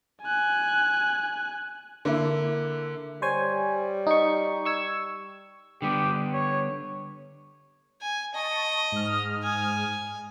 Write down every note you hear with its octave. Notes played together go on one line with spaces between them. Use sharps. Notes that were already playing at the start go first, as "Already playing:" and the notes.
G#5 F#6
D3 A#3 E4
G3 C5 C#5 G#5
D#4 C#6
C#6 E6 G#6
D3 G3 B3 G4
C#5
G#5
D#5 A5 C#6
G#2 D#6 F6
G#5